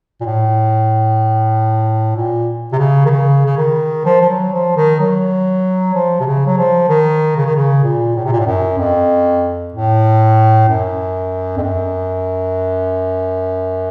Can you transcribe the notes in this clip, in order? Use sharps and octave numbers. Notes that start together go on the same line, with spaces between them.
A#2
A2
A#2
C3
C#3
D#3
C#3
C#3
D#3
F3
F3
F#3
F3
D#3
F#3
F3
C3
C#3
F#3
F3
D#3
C#3
D#3
C#3
A#2
A2
C3
A#2
A2
F#2
F2
A2
F#2
F2
F#2